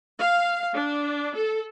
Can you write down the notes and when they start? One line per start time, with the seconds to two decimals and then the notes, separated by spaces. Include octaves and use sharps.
0.17 F5
0.74 D4
1.37 A4